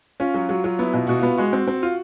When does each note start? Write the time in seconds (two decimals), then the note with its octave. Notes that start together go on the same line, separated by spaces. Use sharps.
0.20 C#4 F4
0.34 F#3 F#4
0.49 F#3 F#4
0.64 F#3 F4
0.79 B3 E4
0.93 B2 F4
1.07 B2 F#4
1.19 B3 F4
1.38 G#3 F#4
1.53 C4
1.68 C4
1.83 F4